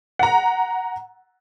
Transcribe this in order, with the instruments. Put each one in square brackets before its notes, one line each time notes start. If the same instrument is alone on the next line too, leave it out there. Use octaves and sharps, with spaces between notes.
[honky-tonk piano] F#5 A#5